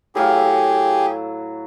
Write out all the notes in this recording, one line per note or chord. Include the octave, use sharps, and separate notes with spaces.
A2 F#3 G4 G#4 F5